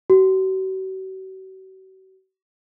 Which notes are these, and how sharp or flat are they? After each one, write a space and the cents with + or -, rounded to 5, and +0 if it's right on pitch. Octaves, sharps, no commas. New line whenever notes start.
F#4 +40